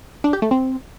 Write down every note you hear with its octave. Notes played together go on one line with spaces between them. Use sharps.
D4
G4
A3
C4